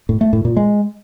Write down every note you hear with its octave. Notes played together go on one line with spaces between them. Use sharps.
A2
A3
A2
A#2
G#3